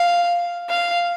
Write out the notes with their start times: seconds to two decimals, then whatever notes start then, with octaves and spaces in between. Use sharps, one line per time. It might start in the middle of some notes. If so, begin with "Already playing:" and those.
Already playing: F5
0.69 F5